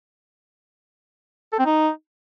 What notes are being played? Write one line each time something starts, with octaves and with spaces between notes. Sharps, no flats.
A4
C4
D#4